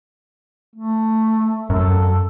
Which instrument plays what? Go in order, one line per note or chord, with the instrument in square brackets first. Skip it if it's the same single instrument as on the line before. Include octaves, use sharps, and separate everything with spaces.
[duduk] A3
[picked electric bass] F#2 [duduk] A4